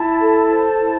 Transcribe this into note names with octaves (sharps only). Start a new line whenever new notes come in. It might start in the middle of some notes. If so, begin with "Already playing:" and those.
Already playing: E4 A5
A4
C5
E4